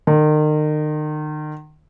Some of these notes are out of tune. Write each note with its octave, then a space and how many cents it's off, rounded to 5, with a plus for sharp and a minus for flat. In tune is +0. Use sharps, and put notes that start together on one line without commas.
D#3 -35